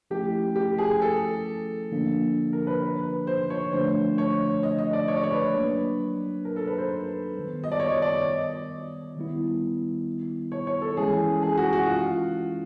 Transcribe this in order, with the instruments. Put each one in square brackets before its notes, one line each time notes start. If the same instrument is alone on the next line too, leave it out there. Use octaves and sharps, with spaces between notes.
[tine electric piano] F3 A3 C#4 E4 [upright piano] G4
[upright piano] G4
G#4
A4
[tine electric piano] D3 F3 A#3 D4
[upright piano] A#4
B4
B4
C5
C#5
[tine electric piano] D3 F3 A3 D4 [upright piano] C5
[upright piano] C#5
D#5
D#5
D5
C#5
D5
C#5
B4
[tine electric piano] F#3 A#3 D4
[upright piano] A#4
A4
B4
C5
[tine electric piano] D#3 G3 B3
[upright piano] D#5
D5
C#5
C#5
D5
D#5
[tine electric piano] D#3 G3 B3 E4
[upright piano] C#5
C#5
A4
[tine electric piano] E3 G#3 C#4 E4 [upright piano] G#4
[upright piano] G#4
F#4
F#4
F4